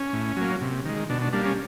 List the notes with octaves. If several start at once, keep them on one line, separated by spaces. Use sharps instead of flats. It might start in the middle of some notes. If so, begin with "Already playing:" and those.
Already playing: C#4
A2
F#3 A#3
C3
D#3 G#3
B2 D4
D4
G3 A#3 D4
C#4